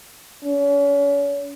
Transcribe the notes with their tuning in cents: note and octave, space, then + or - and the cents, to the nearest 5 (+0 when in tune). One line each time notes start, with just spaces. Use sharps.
C#4 +35